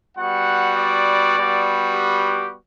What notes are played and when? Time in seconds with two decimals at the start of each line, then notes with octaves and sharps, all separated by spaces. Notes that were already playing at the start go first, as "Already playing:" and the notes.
0.17 G3 B3 F#4 F#5
0.77 D5
1.36 G3 B3 F#4
1.95 G4